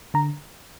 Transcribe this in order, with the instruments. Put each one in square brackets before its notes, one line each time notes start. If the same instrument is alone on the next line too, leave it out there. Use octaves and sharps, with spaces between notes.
[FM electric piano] D3 A#5